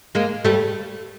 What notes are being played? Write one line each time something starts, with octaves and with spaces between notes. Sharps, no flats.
G#3 A#3
G3 A3